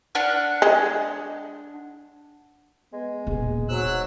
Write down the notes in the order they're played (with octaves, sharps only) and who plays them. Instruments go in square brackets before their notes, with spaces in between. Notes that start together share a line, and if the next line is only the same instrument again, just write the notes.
[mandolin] D4 F#5 F6
[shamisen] G#3
[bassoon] G#3 [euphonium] B3
[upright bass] D#1 B2 [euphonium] G#4
[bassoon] G#2 [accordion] F#3 E6 F#6